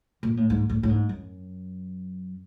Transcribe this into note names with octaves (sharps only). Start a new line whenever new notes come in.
A#2
A2
G#2
A2
A2
G#2
F#2